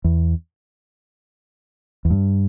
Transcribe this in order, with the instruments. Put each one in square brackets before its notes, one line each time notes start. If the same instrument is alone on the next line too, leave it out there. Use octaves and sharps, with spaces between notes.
[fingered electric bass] E2
E2
G2